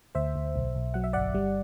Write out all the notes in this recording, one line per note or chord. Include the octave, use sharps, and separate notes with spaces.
D2 C5 E5
D2
B1
B1
F#3 F#5
E5
G1 D5 F#5
G3